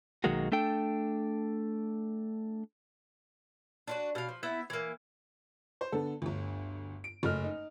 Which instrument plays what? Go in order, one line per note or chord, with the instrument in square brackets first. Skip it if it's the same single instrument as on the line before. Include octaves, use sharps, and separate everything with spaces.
[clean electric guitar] B1 D#3 F#3 G#3 A#3 F#4
A3 D4 A4 G5
[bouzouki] D4 F4 F#4
B2 F5
F3
B3 E4 E5
E3 A#3
[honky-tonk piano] C5
D3 B3 A4
G1 D2
D7
F#1 A3 D#5 F6
D#4